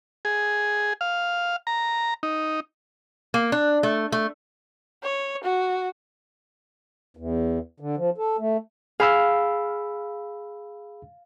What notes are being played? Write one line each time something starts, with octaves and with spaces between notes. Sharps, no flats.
G#4
F5
A#5
D#4
A#3
D4
A3
A3
C#5
F#4
E2
D3
F3
A4
A3
G#4 F5 B5 E6